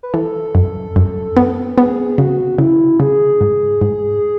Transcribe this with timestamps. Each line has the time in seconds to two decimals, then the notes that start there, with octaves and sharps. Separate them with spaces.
0.03 B4
0.13 E3 A4
0.55 F#2
0.96 F#2
1.37 B3
1.77 B3 G#4
2.18 C#3 F#4
2.58 C#3 E4
3.00 C#3 G#4
3.41 G#2
3.81 G#2